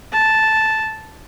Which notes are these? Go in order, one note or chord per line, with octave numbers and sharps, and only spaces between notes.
A5